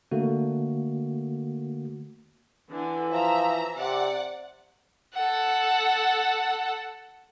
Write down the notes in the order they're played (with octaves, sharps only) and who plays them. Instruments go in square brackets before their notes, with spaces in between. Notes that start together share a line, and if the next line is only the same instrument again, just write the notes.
[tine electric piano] D3 A3 A#3 F#4
[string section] D3 [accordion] E3
[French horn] F3 [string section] E5 A#5
[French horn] C3 [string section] D5 F#5
[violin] A4 F#5